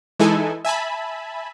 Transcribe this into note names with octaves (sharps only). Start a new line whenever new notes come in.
E3 G#3 D#4 E4 A4 G#5
E5 G#5 A5 B5